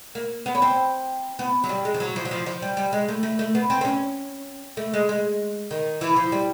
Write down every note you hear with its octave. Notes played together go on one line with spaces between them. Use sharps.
A#3
B3
C#4
C4
B3
F#3
G3
G#3
F3
F#3
F3
F#3
F3
F3
G3
G3
G#3
A3
A3
A3
B3
C4
C4
C#4
A3
G#3
G#3
D#3
E3
F3
G3